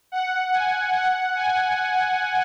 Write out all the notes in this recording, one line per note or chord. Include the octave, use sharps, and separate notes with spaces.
F#5
G#5
F#5
G#5